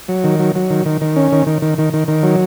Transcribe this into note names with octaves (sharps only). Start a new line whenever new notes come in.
F#3
D#3
F#3
F#3
D#3
D#3
D#3
C#4
D#3
D#3
D#3
D#3
D#3
D#3
F#3